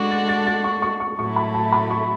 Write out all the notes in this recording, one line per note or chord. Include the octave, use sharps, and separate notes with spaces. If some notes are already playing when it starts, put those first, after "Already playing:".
Already playing: G#3 D4 F#4 A4 C#6 D6
A6
A6
A6
C#6
C#6
C#6
A2 F#3 A3 E4 C#6
B5
A5
B5
C#6